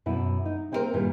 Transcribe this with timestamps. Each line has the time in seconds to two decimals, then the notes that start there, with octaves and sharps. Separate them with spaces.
0.06 F#2 B2 E4
0.45 D#4
0.72 A#3 C4 E4 F#4 A#4 C5
0.94 G2 A#2 D#3 G3 E4